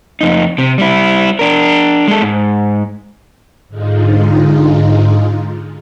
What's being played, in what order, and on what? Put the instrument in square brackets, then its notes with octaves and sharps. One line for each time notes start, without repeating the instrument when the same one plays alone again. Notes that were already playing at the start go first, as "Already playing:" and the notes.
[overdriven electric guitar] F2 D#4
C3
G3 E4
D4 A#4
G#3 A4
G#2
[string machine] G#2 D3 G#3 D#4 F4